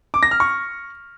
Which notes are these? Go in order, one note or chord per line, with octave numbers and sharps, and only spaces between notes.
D6
A#6
F6
C#6